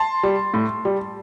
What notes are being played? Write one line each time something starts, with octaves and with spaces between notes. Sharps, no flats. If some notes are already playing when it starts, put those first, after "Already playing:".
Already playing: A5 C6
G3
A2
G3